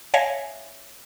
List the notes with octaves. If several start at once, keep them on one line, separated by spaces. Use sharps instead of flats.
C#5 E5 F5 G#5 A#6